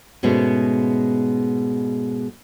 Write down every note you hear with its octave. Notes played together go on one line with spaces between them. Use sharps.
G#2 B2 G#3 A3 B3 C#4